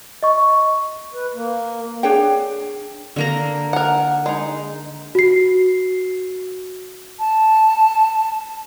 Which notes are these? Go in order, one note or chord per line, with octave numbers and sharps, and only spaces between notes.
D#5 C#6
B4
A#3
D4 G#4 C#5 G5
D3 A#3 A#5
A#4 F#5
G#3 D#4
F#4 C7
A5